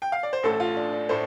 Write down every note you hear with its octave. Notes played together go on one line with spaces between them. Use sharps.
G5
F5
D5
C5
A1 A2 A3 A4
F4
D4
D4
A2 A3 C5